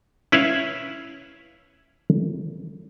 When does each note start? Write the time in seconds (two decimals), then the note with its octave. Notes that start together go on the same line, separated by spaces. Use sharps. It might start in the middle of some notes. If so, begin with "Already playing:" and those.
0.32 C#4 E4 B4 C#5 E5 F5